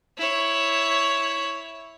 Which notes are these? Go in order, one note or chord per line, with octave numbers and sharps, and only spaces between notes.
E4 C#5